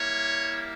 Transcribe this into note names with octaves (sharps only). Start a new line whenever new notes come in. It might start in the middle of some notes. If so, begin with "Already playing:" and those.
Already playing: G3 A#3 E4 C#5